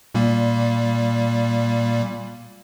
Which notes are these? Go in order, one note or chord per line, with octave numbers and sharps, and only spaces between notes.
A#2 G3 A#3